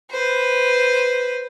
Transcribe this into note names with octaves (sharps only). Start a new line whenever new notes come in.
B4 C5